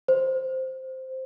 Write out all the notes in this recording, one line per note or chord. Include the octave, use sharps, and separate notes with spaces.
C5